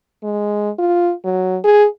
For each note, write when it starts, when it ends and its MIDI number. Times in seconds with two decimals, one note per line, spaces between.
0.23 0.70 56
0.78 1.12 65
1.24 1.58 54
1.64 1.86 68